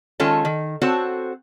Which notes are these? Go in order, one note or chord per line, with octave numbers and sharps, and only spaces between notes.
D#3 G#3 C#4 F4 A4 C#5
D#3
C4 F#4 A4 C5 C#5